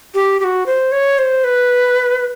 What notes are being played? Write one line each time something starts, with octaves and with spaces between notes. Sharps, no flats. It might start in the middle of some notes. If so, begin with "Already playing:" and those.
G4
G4
F#4
C5
C#5
C5
B4